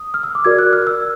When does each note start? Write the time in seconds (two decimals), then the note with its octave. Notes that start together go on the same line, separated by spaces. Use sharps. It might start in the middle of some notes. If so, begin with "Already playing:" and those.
Already playing: D#6
0.14 F6
0.23 E6
0.35 D6
0.45 F#4 A#4 D5 G#6
0.59 F#6
0.73 F6
0.87 E6